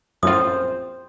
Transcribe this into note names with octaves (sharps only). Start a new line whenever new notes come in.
A#1 F#2 A2 C4 F4 C5 D#6